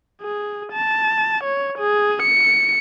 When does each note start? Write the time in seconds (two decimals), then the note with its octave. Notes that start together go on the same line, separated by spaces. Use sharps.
0.22 G#4
0.73 A5
1.44 C#5
1.78 G#4
2.23 C#7